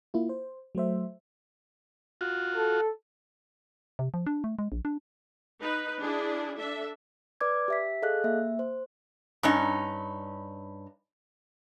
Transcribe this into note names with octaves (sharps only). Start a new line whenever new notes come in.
A#3 E4 F4
C5
F#3 A3 C5 E5
F4 F#4
A4
C3
F3
D4
A3
G#3
A#1
D4
D#4 B4
D4 E4 G#4
D4 A4 E5
B4 D5 D6 G#6
G4 E5 B6
G#4 A4 D#5 F5 F#6
A#3 E5
C5
G2 C#4 D#4